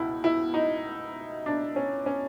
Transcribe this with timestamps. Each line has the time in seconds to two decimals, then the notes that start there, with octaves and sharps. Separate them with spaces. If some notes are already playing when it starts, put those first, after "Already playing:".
Already playing: C#2 B2 E4
0.24 E4
0.54 D#4
1.46 D4
1.76 C#4
2.06 C#4